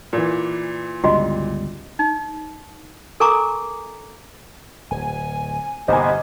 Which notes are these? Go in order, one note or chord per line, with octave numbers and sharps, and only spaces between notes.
A#2 E3
G1 C#2 G3 F4 F#4 D#5
D#4
A4 A#4 G#5 A#5 C#6 D6
D1 G#5
G1 C3 A#3 B3 C5 D#5 G#5